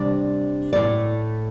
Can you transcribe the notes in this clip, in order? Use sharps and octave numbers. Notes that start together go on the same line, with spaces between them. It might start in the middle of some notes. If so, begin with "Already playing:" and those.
Already playing: C3 G3 D4 D5
A2 A3 E4 D5